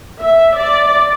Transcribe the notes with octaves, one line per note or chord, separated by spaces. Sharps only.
E5
D5